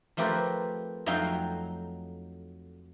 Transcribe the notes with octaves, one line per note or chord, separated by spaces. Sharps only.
F3 A3 C4 G4 A#4 B4
F2 F#3 A3 D#4 F5 G5